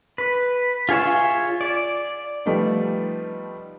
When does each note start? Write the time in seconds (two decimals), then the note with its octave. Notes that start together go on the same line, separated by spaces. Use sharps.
0.18 B4
0.89 F4 G#4 C#5 E5
1.61 D5
2.46 F3 G3 A3 B3 D#4